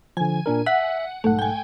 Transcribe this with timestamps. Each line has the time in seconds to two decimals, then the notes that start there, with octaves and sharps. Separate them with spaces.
0.17 D3 F3 G#5
0.46 A#2 D4 A#4
0.66 E5 F#5 B6
1.24 B1 G#2 A3 F#5
1.39 G5 G#5